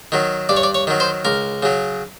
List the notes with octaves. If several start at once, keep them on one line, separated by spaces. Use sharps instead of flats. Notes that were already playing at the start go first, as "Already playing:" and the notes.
D#3 F#3
G2 D5
C#5
D5
C#5
D#3 F#3
C5
C#2 A#4
C#3 F#3